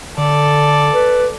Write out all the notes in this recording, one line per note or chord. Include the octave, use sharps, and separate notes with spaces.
D3 A4 D5
B4